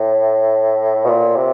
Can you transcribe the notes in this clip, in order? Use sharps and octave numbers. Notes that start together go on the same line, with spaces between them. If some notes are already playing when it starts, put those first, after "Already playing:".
Already playing: A2
B2
A#2
C3